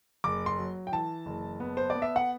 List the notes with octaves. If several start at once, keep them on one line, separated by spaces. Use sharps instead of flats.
F#1 D6
C6
F#3
G5
E3 A5
F#1
B3
C5
D5
B3
E5
F#5